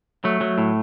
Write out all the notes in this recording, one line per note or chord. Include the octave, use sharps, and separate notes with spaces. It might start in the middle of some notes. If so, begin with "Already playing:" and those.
F#3 A3
F#3
A2